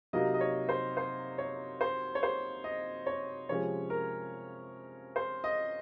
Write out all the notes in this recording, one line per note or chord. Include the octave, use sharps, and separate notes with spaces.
C3 F#3 A#3 D#4 D#5
D#5
C#5
C5
C5
C#5
C5
C#5
C5
D#5
C#5
C3 F3 G#3 C#4 C#5
A#4
C5
D#5